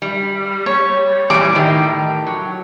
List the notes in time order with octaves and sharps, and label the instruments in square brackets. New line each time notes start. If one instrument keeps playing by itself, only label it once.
[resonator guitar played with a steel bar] G3
[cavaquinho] C#5
[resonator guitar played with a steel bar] A#2 E3 G3 [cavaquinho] D6
[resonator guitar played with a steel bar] A2 D#3 G4
F#3